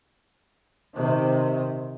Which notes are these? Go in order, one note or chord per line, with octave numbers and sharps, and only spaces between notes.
C3 D#3